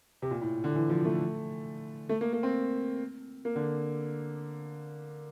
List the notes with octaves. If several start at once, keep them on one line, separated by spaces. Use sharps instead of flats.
C3
A#2
A2
D3
E3
F3
A3
A3
A#3
A#3
C4
A#3
D3